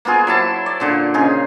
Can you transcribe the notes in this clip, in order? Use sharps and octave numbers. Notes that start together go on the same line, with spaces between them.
A#3 B3 F4 G#4
F#3 E4 A5 C6
D5
A#2 D3 F4
C#3 D#4 F4 G#4